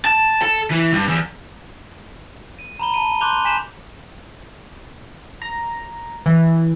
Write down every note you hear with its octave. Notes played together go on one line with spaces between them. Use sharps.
A5
A4
E3
G2
E2
D#7
A#5 B5 G7
A5 D#7
C6 D6 F#6 G6 F7 G7
G#5 G6 B6 D#7 E7 F#7
A#5
E3